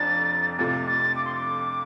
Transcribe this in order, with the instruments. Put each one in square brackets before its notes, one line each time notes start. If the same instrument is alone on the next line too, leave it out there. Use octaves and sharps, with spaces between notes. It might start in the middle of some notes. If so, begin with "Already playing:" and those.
Already playing: [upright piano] F1 F2 F3 D4 [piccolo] A6
[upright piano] F2 C3 F3 A3 F4 [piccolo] A6
[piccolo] A6
D6
C6
D6